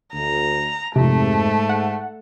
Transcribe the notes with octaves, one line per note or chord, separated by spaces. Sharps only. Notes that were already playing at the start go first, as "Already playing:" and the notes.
D2 A#5
F2 G#2 C3 A3
F#5